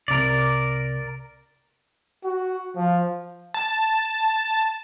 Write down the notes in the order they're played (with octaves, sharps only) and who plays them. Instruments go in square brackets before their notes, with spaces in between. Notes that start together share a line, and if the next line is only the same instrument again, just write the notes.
[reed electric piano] C2 C3 [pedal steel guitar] A#4 D5
[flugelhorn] F#4
F3
[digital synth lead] A5